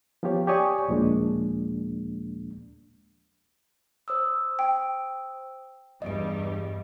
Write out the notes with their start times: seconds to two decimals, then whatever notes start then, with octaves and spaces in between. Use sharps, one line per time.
0.23 F3 B3 F4 G4 C#5
0.47 G4 C#5 D5 G#5 C#6 D#6
0.88 D#2 A#2 F3 G#3 A#3 D4
4.08 C5 D#6 E6
4.59 G5
6.02 E2 G2 G3 D#5 D7